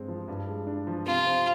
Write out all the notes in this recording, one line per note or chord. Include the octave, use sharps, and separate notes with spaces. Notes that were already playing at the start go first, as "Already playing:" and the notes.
Already playing: G2 G#3 C4
F3
G2
G#3
D4
F3
C3 F4
C4